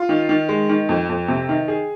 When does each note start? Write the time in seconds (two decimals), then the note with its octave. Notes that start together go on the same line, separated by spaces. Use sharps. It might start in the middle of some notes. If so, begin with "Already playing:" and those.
Already playing: F4
0.09 D#3
0.29 D#3
0.49 G#3
0.69 D#3
0.89 F2
1.09 F2
1.28 C3
1.49 D#3
1.68 G#4